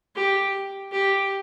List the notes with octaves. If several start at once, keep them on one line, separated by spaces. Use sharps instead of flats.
G4
G4